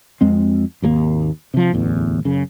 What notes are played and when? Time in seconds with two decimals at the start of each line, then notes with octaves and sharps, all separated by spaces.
0.21 F2 G#3 C4
0.82 G#1 D#2 F3 A#3
1.54 C3 F3
1.73 D1 A1 E2
2.25 F#2 C#3